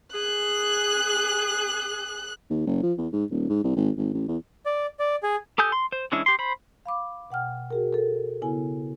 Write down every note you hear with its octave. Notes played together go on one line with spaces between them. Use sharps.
G#4 F#6
D#2
F#1
F3
E2
G#2
D#1
G#2
C2
G#1
G#1
A1
E2
D5
D5
G#4
G4 A4 G#5 D#6 G6
C6
C5
E3 G#3 C#4 D4 E4
G4 C6
C5 B5
F5 B5 D6
B2 F#5 G5 F6
F#4 G#4 A#4
A4 A#4
C#3 B3 E4 G#5